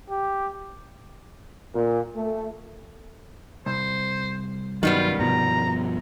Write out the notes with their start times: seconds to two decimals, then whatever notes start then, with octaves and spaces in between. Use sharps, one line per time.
0.10 G4
1.75 A#2
2.16 A3
3.66 C2 C5
4.83 G2 D#3 F#3 G3 B3 F4
5.19 G2 B2 F3 A#5